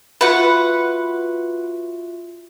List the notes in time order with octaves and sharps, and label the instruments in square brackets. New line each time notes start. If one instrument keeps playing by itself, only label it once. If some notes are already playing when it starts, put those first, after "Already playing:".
[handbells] F4 F#4 E5 [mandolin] B4 F#5